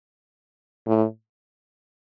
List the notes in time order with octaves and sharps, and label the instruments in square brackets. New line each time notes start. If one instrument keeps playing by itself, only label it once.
[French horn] A2